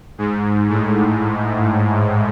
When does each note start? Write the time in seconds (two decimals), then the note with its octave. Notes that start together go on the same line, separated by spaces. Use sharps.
0.18 G#2
0.69 A2